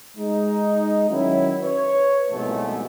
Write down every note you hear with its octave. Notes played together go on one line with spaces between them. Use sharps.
G#3 D#4
D#3 F#3 C#4 E4
B4 C#5
C2 G#2 B2 E3 F3 A3